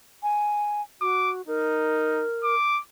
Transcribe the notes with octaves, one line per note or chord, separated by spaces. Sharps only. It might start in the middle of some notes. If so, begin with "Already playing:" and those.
G#5
F#4 D6
D#4 A#4
D6